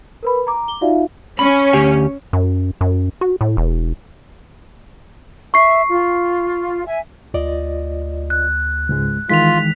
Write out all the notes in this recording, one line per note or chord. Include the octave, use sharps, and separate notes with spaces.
A#4 B4 B5
A#5 D6
G7
D#4 F4 F#4 D5 E5 F5
C#4 B5
D2 G4 G#5
F#2
F#2
F#4
A2
E1
E5 C#6 C7
F4
E5 G#5
D2 F4 D5 D#5
F#6
C#2 G#2 G#3
D#3 E3 G#3 F4 B6 F7